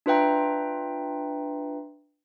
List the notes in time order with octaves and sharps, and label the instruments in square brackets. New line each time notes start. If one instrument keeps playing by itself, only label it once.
[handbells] D4 F4 B4 E5 G5 A#5